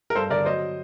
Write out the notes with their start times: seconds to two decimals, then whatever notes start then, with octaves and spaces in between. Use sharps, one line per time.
0.10 A#4
0.15 G2 A4 C5
0.30 D3 A#4 D5
0.45 F#3 C5 D#5